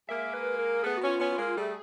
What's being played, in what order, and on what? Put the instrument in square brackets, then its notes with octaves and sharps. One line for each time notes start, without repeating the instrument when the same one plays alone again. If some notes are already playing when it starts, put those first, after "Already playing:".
[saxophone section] G#3 A#3 [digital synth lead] E5
[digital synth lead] B4
A#4
[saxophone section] A3 B3 [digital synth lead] G#4
[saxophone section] B3 C#4 [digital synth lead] F#4
[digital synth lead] F4
[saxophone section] B3 C#4
[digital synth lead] F4
[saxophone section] G#3 A#3
[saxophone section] G3 A3 [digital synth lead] G#4